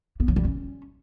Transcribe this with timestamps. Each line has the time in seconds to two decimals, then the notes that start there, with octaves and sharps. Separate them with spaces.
0.20 B3
0.28 F#3
0.36 G3
0.44 C#4